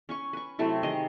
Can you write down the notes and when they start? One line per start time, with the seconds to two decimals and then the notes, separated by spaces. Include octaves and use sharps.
0.09 C#4 G#5 C#6
0.33 B4 C#6
0.59 C3 F#3 A3 E4
0.83 D#3 G4 G#4 D#5